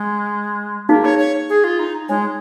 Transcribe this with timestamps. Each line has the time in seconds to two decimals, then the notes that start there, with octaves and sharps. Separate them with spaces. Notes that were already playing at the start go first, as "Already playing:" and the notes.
Already playing: G#3
0.89 A#3 D#4 G#4 F5
1.04 C#5
1.18 C#5
1.49 G#4
1.64 F4
1.79 D#4
2.09 G#3 D#4 C#5 G#5